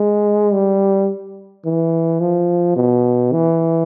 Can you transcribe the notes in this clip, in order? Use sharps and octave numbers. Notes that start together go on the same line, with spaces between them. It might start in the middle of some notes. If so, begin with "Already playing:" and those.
Already playing: G#3
G3
E3
F3
B2
E3